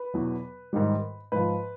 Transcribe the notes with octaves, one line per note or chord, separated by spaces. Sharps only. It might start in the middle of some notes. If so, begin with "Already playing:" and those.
Already playing: B4
E2 B2 F#3
G#2 D#3 G3
G#2 F3 B4